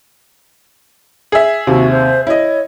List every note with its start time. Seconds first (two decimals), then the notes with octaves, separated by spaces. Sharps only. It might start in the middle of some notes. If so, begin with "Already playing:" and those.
1.32 G#4 E5
1.67 D#2 C3 F#4
1.91 C5
2.27 E4 C#5 D#5